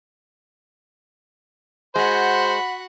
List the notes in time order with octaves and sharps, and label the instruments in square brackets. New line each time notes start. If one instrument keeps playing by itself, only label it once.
[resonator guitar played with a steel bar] G#3 [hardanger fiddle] F#4 F#5 [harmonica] C5 [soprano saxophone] B5